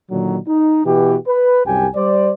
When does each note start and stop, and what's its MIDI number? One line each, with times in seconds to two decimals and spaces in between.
0.11 0.38 46
0.11 0.38 50
0.11 0.38 51
0.11 0.38 54
0.48 0.84 63
0.85 1.16 47
0.85 1.16 52
0.85 1.16 66
0.85 1.16 67
1.27 1.66 71
1.66 1.87 36
1.66 1.87 42
1.66 1.87 67
1.66 1.87 79
1.66 1.87 80
1.96 2.31 55
1.96 2.31 72
1.96 2.31 74